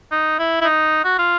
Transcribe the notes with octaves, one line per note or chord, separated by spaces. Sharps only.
D#4
E4
E4
D#4
F#4
F4